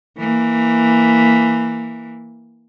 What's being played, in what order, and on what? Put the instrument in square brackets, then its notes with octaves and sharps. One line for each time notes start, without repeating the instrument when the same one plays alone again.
[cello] E3 A#3